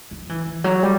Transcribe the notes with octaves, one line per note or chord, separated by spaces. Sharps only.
F#3
E3
E3
F#3
G3